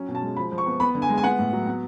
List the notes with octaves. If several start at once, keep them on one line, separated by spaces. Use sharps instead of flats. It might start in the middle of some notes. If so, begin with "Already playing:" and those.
Already playing: F#3 C#4
B2
A5
G#3
F3 B5
F3
C#6
B3
B3 B5
D3
G#5
G#3
G#5
B3 F#5
A2
F#3
B3